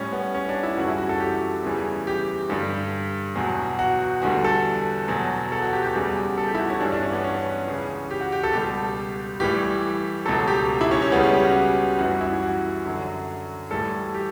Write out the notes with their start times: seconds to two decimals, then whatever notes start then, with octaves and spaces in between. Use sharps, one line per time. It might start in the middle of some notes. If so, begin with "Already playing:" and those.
Already playing: A2 G3 C#4
0.12 B3
0.35 C#4
0.49 D4
0.63 E4
0.77 F#2 C#3 E3 G3 F#4
0.87 E4
0.98 F#4
1.09 A4
1.20 G4
1.63 E2 C#3 E3 G3
2.07 G4
2.50 G2 D3 G3
3.35 E2 B2 F#3
3.79 F#4
4.22 E2 D3 G3 F#4
4.44 A4
5.08 E2 B2 F#3
5.52 A4
5.62 F#4
5.73 G4
5.84 G4
5.95 E2 C#3 G3
6.38 A4
6.48 G4
6.55 E4
6.60 F#4
6.70 C#4
6.81 G2 E3 G3 D4
6.92 D4
7.03 C#4
7.13 B3
7.24 C#4
7.67 C#2 C#3 E3
8.11 G4
8.21 F#4
8.32 G4
8.43 A4
8.53 C#2 B2 G3 G4
9.40 A2 E3 G3 G4
10.26 C#2 B2 F#3 A4
10.48 G4
10.81 E4
10.91 C#4
11.02 C#4
11.12 C#2 C#3 G3 B3
11.23 C#4
11.34 G4
11.45 F#4
11.99 F#2 E3 G3 F#4
12.21 E4
12.42 F#4
12.85 F#2 D3 F#3
13.71 A2 E3 G3 A4
14.15 G4